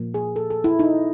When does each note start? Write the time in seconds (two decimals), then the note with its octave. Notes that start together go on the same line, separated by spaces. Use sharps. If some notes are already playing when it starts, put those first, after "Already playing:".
Already playing: A#2 F3 A#3
0.14 G#4
0.36 A4
0.50 A4
0.64 E4
0.79 D#4